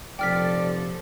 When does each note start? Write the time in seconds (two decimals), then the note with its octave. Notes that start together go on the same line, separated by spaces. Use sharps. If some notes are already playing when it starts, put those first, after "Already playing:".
0.19 F1 A#2 F3 A4 D5 G5 F6 B6